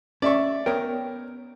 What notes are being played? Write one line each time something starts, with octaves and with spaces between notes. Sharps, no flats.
C#4 D5 E5 C#6
B3 A#4 C#5 G5